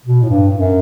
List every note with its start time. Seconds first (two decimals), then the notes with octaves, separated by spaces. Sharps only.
0.06 B2
0.22 A2
0.30 G2
0.54 F#2